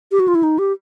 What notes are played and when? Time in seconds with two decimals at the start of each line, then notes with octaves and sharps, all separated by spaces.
0.12 G4
0.20 F#4
0.28 F4
0.35 E4
0.43 D#4
0.59 G4